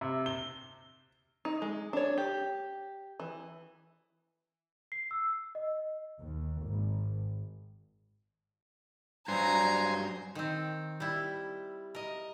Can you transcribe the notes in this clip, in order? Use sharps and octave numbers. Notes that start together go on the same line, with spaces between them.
C3
G7
D#4
G#3
D4 C#5
G4
E3
C7
E6
D#5
D#2
G#1
G2 F#3 C5 G#5 A#5 C6
D#3 C4
G3 E4
A#4 D#5